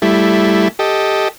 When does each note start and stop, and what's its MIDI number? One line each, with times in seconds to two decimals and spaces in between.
0.02 0.68 55
0.02 0.68 57
0.02 0.68 64
0.79 1.28 67
0.79 1.28 69
0.79 1.28 75